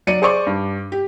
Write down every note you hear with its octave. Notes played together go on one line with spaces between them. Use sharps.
F#3 D5 C#7 D#7
G#4 C5 D5 C#6 D6
G2
G4